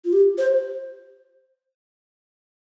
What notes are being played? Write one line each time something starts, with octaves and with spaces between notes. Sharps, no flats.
F4
G4
C5